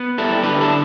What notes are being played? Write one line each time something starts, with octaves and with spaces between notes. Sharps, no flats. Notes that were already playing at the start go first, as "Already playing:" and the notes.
Already playing: B3
G3 E4 A4
D3 G4 B4
E4 A4